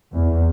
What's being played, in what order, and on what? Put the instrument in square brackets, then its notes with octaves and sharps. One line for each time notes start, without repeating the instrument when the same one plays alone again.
[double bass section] E2